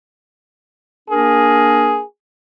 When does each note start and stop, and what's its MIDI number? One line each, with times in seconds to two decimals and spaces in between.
1.09 1.99 58
1.09 1.99 62
1.09 2.04 68
1.09 1.99 70